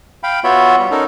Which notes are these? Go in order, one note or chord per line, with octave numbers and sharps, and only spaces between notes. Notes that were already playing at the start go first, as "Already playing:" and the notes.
F5 G5 B5
B3 F4 F#4 C#5 E5 B5
G3
C#4 D#4 A4 A#4